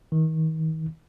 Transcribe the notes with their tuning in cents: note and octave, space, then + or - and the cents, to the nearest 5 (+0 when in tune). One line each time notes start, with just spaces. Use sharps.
D#3 +35